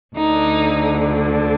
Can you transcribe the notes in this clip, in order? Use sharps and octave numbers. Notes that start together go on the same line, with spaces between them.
D2 D3 D#4